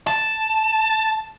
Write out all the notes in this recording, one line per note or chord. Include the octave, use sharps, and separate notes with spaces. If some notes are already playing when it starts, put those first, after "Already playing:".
A5